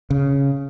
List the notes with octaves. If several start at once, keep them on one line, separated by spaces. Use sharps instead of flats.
C#3